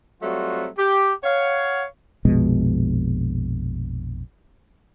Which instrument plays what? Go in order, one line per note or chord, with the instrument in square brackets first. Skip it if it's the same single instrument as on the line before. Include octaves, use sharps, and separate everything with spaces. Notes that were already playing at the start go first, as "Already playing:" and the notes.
[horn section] F#3 G3 A3 C4 F4 F#4
G4
C#5 F5 F#5
[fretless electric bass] A#1 F2 B2 G#3